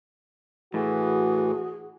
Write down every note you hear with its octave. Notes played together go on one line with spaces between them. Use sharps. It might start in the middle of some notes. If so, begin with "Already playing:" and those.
A2 E3 F#4 G#4